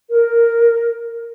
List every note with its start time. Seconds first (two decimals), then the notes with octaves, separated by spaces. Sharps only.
0.11 A#4